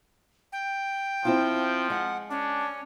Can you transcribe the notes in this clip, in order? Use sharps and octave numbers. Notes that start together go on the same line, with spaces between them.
G5
F3 C4 E4 F4
G#3 F#5
C#4 D4